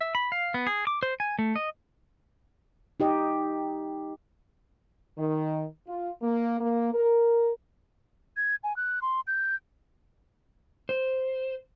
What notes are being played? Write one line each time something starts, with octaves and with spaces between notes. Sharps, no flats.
E5
B5
F5
B3
G#4
D6
C5
G#5
A3
D#5
D#4 G4 D#5
D#3
F4
A#3
A#3
A#4
G#6
G#5
F#6
C6
G6
C5